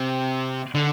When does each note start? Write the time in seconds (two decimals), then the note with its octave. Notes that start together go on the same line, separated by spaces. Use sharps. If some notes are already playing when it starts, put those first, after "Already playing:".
Already playing: C3
0.75 D3